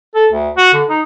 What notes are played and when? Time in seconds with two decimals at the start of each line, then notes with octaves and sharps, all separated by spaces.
0.15 A4
0.32 D2
0.57 F#4
0.74 D3
0.89 D#4